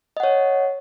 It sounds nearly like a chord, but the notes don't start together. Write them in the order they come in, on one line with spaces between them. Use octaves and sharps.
D#5 F#5 C#5